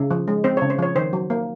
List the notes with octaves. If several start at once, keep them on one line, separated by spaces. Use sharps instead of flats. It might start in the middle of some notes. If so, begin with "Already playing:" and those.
Already playing: C#3
F3
G#3
C4 C5
C#5
C#3
C5
F3 C#5
D#3 C5
F#3
A#3